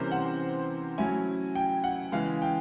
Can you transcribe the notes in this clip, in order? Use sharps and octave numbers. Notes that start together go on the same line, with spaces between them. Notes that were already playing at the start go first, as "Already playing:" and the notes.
Already playing: C3 E3 G3 A#3 C#4 C5
F#5
F#3 A3 C#4 E4 G#5
G5
F#5
C#3 E3 G#3 F5
G5